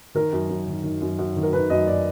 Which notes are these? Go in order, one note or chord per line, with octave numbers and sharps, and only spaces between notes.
D#3 A#4
F#2
F#2
D#3
D#3
F#2
F#2
D#3
A#4
D#3 B4
F#2 D#5
D5